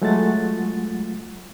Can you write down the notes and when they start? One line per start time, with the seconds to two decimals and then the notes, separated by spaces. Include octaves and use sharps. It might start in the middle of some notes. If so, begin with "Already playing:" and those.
0.02 F#3 G#3 A3 F4 F#5 A6